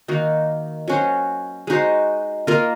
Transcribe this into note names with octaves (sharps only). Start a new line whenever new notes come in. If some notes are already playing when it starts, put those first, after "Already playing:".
D#3 A#3 D#4 F#4
F#3 C#4 F#4 C5
G#3 D#4 F#4 C5
A#3 F4 A#4 D#5